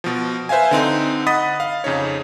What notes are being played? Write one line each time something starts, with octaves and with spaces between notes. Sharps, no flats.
B2 F3
B4 C5 E5 F5 G#5
D3 C4 D#4
D#5 F#5 B5 D#6 A6 B6
F5
F2 C#3 D#4 C#5